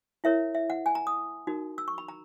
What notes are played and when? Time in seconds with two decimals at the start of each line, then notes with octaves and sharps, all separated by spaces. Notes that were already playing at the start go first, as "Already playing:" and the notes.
0.24 E4 A#4 C#5 E5
0.55 E5
0.70 F#5
0.86 G#5
0.95 A#5
1.07 D#6
1.47 D#4 F#4 A#4
1.78 E6
1.88 C#6
1.98 B5
2.08 A#5